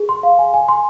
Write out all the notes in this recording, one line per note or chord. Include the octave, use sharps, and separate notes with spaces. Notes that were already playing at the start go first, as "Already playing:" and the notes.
Already playing: G#4
C6
F5
G#5
G#5
C6